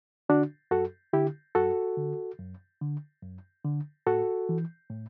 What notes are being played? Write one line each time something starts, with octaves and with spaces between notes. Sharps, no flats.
D3 D4 F#4
F#2 F#4 A4
D3 E4 G4
F#2 F#4 A4
D3
F#2
D3
F#2
D3
A2 F#4 A4
E3
A2